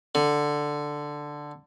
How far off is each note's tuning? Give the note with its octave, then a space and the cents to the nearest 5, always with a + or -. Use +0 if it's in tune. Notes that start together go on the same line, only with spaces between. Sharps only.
D3 +5